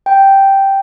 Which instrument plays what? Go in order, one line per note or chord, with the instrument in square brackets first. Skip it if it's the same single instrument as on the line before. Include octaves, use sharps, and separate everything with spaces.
[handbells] G5